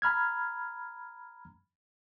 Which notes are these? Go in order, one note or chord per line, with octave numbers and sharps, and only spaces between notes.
A#5 B5 F6 G#6